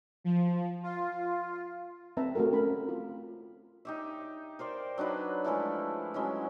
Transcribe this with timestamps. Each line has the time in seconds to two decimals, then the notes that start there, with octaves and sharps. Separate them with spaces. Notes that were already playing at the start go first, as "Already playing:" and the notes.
0.24 F3
0.83 F4
2.17 C4 B4 E5 A5 A#5
2.35 A3 C4 F#4 G4 A#4
2.53 C#4 A#4 B5
2.89 F4
3.85 D#4 G4 E5
4.59 A#4 C5 D5 G5
4.98 F#3 D4 D#4 B4
5.44 F3 G#3 A3 E4
6.14 F#3 G#3 C#4 E4